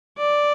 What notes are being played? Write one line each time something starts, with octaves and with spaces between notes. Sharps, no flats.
D5